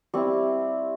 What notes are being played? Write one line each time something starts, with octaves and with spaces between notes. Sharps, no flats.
G3 C4 E4 C#6